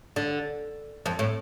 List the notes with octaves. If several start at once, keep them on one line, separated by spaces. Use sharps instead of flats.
D3
F2
A2